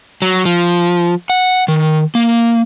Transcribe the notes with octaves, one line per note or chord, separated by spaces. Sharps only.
F#3
F3
F#5
D#3
A#3